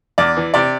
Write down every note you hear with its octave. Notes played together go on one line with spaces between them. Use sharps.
E2 D5
E3
C3 D5